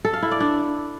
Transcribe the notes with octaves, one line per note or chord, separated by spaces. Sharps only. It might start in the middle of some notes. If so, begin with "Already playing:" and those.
A4
F5
E4
D5
D4